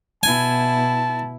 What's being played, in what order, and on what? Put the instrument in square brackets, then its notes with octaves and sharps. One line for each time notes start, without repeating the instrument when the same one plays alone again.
[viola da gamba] B2 E4 [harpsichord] G#5 [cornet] A5